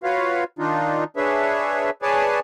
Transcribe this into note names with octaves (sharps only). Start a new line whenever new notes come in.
F4 F#4 B4 C#5 F5
D#3 D4 D#4 F4
D4 G#4 B4 C#5 E5
G#4 B4 C#5 D5 G#5 A5